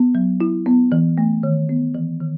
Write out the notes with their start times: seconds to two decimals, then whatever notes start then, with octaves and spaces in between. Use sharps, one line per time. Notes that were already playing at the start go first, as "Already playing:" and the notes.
Already playing: B3
0.15 F#3
0.40 E4
0.66 B3
0.92 E3
1.18 A3
1.43 D#3
1.69 B3
1.95 E3
2.20 D#3